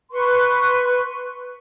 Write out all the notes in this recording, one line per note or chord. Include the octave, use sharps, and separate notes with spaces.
B4 C6 C#6